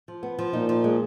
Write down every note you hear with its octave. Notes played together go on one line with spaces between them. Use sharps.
F3
B3
F3
A#2 D#4
F3
G#3